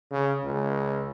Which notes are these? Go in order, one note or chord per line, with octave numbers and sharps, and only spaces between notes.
C#3
C#2